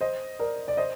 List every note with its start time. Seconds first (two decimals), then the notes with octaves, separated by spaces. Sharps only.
0.01 C5 D#5
0.39 A#4 D5
0.68 D5
0.77 C5 D#5